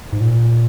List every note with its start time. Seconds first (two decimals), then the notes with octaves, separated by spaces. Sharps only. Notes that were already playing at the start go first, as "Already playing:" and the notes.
0.13 G#2
0.21 A#2